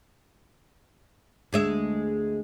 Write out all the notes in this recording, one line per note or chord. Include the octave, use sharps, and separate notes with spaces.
D2 G#3 E5